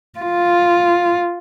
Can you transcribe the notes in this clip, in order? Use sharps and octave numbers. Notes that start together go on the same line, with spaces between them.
F4